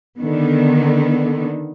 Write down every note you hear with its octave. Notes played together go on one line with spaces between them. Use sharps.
D3 D#3 B3